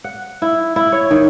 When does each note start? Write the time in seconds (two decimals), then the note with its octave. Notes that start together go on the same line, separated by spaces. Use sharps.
0.04 F#5
0.42 E4
0.76 E4
0.92 C#5
1.11 D#3